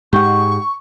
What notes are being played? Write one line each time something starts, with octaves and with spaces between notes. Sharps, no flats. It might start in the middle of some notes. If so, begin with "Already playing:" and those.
G#2 G#3 G4 F#5 C#6